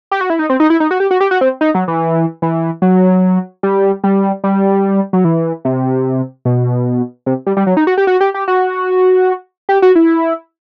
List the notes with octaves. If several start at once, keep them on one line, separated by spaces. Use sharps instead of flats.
G4
F#4
E4
D#4
C4
D#4
E4
D#4
F#4
G4
F#4
G4
F#4
C4
D#4
F#3
E3
E3
F#3
G3
G3
G3
F#3
E3
C3
B2
C3
G3
G3
F#3
D#4
F#4
G4
F#4
G4
G4
F#4
G4
F#4
E4